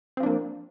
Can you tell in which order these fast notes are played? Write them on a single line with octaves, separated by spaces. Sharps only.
C4 F3 D4 A#3